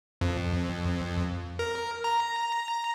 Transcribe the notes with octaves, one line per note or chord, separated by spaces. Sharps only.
F2
A#4
A#5